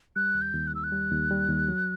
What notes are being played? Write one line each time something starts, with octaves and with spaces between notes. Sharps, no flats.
G3 F#6
D#2
G6
D#2
F#6
D#3 E6
F#6
G3
D#2
G3
D#2
F#3